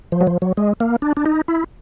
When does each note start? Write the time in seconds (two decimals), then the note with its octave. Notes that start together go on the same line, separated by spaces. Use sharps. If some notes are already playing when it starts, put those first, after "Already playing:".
0.12 F3
0.21 F#3
0.27 F3
0.42 F#3
0.57 G#3
0.80 A#3
1.02 D4
1.17 D4
1.26 D#4
1.48 E4